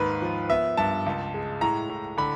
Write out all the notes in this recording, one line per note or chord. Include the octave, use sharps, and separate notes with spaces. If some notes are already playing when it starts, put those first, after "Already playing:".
Already playing: D#2 G#2 B4
F3
B3 E5
G2 A5
C#2
G#3
A2 A#5
A2
D3 B5